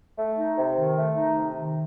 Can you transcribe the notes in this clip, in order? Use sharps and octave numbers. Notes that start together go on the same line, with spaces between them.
A3
D#4
C3
D#3
A3
D#4
C3
D#3